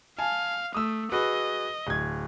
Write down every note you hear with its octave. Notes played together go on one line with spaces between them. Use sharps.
F5 G#5 A5
A3 D#6 E6
F#4 G#4 B4 D#5
D1 G#6